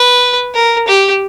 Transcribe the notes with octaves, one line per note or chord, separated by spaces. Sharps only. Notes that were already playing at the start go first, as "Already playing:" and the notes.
Already playing: B4
A#4
G4